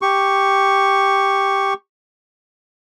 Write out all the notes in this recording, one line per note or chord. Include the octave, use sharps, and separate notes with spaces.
G4 C#6